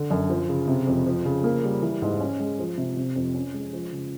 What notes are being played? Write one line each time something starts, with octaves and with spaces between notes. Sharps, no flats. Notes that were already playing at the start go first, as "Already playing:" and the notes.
Already playing: D3
F#2
F3
C#3
C3
F2
F3
C#3
A#3
G3
E3
G#2
C#4
G#3
F3
C3
C3
F2
C#4
G#3
F3
C#3